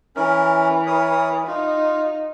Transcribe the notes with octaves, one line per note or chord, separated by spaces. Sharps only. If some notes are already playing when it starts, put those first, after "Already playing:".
E3 C#4 A#4
A#4 C#5 D#6
D#4 F4